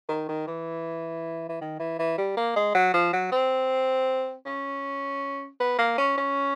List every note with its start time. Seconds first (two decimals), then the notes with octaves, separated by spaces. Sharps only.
0.09 D#3
0.29 D#3
0.47 E3
1.49 E3
1.61 D#3
1.79 E3
1.99 E3
2.18 G3
2.37 A#3
2.56 G#3
2.75 F#3
2.94 F3
3.13 F#3
3.32 C4
4.46 C#4
5.60 B3
5.78 A#3
5.98 C#4
6.18 C#4